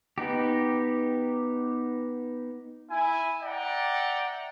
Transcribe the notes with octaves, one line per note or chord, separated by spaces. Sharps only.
B3 D#4 G4
E4 G#5
D5 E5 F#5 G5 A#5